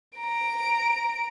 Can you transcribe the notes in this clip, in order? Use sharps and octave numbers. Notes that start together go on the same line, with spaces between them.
A#5 D7